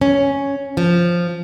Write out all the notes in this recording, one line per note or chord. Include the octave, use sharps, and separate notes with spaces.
C#4
F3